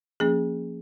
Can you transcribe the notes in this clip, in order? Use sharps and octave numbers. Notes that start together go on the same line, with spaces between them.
F3 A#3 C#4 G#4